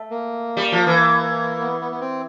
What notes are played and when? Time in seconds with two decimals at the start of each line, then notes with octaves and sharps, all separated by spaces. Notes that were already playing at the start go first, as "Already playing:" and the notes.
Already playing: A3
0.11 A#3
0.57 G3
0.72 F3
0.87 E3
1.60 B3
1.81 B3
1.92 B3
2.01 C4